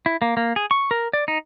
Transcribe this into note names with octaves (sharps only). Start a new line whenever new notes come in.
E4
A#3
A#3
G#4
C#6
A#4
D5
D#4